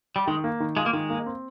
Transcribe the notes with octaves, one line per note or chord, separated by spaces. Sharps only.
G3
D#3 G#3
A#3
D#3
G#3 F4
A#3
D#3 G#3
A#3
C4